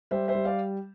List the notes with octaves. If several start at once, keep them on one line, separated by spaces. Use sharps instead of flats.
G3 C5 E5
C5 E5
G3
D5 F5